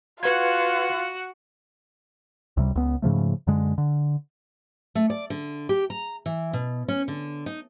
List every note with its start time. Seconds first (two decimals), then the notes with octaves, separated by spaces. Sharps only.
0.23 F4 F#4 B4 F#5 G#6
2.57 C#2 C3 G3
2.75 C#2 B3
3.02 G#2 C#3 F3 A3
3.47 F#2 D3 G#3
3.78 D3
4.95 A3
5.10 D5
5.30 D3
5.69 G4
5.90 A#5
6.26 E3
6.53 B2
6.88 C#4
7.08 D3
7.46 D#4